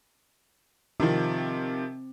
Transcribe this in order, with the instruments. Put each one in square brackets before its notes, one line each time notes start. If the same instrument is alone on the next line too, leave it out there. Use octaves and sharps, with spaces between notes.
[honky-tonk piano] C3 D#3 F3 [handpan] C4